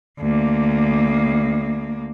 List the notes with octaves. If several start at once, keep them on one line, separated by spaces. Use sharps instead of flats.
D2 A#3